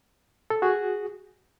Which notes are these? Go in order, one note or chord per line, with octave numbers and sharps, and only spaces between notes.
A4
F#4 G#4